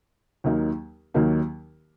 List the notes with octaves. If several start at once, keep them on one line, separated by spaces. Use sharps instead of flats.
D#2 D#3 F#3 A#3 D#4
D#2 D#3 F#3 A#3 D#4